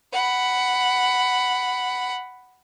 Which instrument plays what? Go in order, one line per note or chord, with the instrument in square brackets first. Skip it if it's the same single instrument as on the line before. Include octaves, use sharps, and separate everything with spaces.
[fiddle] F#5 B5